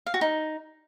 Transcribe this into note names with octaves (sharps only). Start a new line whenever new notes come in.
F5
F#4
D#4